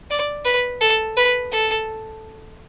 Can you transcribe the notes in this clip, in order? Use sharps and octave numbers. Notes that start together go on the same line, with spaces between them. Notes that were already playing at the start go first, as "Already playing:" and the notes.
D5
B4
A4
B4
A4